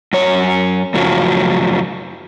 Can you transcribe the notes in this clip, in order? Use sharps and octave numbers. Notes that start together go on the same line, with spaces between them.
F#2 C#5
F#2 A2 C#3 F3 F#3